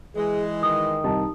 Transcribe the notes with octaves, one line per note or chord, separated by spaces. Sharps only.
E3 G#3 G#4
D#3 D#6
C2 D#4 A5